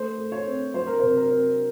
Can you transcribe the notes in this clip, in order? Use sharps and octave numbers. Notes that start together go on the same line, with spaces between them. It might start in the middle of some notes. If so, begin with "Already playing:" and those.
Already playing: A3 C5
A3
C#5
C4
F#3 C5
A#4
C5
C3
A#4
C4